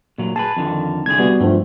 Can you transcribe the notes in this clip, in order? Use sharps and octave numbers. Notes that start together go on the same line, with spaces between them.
A#2 F#3
G#4 A4 B4 A5
F2 D3 D#3
C2 D3 G#4 G#6
G3 B3 F#4
G2 F3 A3